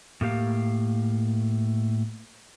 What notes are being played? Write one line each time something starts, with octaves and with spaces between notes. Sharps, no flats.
A2 A#3 G4 F5